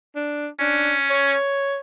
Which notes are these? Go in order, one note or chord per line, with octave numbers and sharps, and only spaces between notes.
D4
C#4 D4
C#5